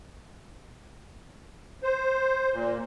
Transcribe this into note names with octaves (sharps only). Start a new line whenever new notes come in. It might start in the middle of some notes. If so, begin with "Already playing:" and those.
C5
A#2